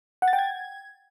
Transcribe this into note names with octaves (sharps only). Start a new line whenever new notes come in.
F#5
A6
G5
G#6